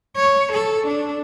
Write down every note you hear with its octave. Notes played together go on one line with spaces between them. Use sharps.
C#5
A4
D4